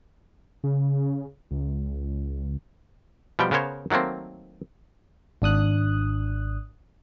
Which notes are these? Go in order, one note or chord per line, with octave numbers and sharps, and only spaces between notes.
C#3
C#2
B2 F3 G3 G5
C#3 B3 A#4 C5 C#5
D#3 F#3 A3 A#3 C4
G#1 D4 D#6 F#6